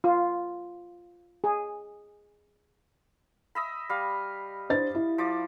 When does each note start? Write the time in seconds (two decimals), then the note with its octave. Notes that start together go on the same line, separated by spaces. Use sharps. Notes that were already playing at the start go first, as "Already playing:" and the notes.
0.04 F4
1.44 G#4
3.55 D#5 E5 B5
3.89 G3 F5
4.70 D4 C5 A6
4.95 E4
5.18 F3 D5